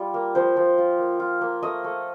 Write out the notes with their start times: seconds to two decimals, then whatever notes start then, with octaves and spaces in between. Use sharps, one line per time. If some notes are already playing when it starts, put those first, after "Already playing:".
Already playing: G3 F4
0.14 A#3
0.35 F3 C5
0.57 F3
0.78 F4
0.99 A#3
1.20 F4
1.41 A#3
1.62 A3 D#5
1.84 A3